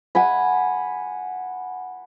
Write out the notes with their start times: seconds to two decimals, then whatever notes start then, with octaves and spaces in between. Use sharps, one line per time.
0.15 F#5 G#5 B5